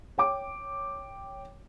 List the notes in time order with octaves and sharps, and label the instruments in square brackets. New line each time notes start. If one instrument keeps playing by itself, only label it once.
[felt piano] C#5 G5 D6